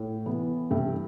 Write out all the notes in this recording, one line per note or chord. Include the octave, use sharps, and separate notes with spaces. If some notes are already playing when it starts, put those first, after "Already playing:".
Already playing: A2
E3 B3
G2 E5 G5